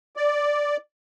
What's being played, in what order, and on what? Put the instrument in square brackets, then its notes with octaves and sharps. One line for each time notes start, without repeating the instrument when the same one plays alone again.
[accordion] D5